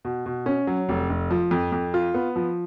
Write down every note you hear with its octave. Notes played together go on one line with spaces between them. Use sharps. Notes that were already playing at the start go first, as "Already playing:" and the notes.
B2
B2
C#4
F#3
F1
F1
F3
F2
F2
F4
B3
F3